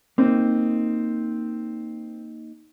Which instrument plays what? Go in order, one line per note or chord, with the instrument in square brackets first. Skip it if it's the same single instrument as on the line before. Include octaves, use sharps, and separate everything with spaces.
[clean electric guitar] A#3 D#4 [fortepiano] C4